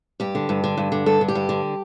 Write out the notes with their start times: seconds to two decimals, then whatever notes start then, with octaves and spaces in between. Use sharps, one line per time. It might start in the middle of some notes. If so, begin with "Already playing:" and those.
0.20 G2 G4
0.35 D3
0.49 G2
0.64 D3
0.78 G2
0.92 D3
1.06 G2 A4
1.21 D3
1.28 G4
1.35 G2
1.49 D3